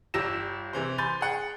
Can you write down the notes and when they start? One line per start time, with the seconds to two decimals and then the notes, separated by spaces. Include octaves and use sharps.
0.14 G1 G3 G4 E6 A#6 E7
0.73 C3 E3 C5
0.98 G#5 B5 C6 G6 A6
1.21 G#4 F#5 G5